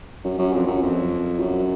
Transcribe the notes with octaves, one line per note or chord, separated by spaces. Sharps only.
F#2
F#2
F2
F#2
F2
F#2